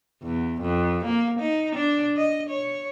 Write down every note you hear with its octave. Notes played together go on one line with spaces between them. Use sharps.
E2
F2
A#3
D#4
D4
D#5
C#5